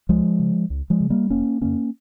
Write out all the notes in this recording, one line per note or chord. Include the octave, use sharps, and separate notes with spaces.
C#2 F3 G#3
C#3
C#2
F3 G#3
C#3
G3 A#3
F1 A#3 C#4
F2 C#3 A#3 C#4